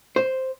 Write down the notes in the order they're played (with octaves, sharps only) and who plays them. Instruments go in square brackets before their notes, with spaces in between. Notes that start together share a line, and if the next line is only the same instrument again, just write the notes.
[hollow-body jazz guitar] C5